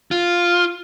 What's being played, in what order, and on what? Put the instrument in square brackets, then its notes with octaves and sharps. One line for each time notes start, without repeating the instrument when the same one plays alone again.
[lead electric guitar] F4